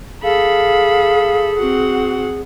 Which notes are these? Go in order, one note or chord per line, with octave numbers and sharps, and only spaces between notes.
G#4 A4 F5 B5
C4 F#4 F#5